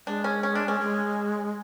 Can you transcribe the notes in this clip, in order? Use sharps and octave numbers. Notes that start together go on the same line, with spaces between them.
G#3 D4
C#4
C#4
D4
C#4
G#3